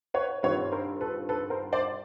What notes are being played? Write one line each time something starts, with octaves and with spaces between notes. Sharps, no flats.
B4 C#5
G2 D#3 G3 C4 F4 B4 C#5
A#4 C5
A4 B4
A4 B4
A#4 C5
C5 D5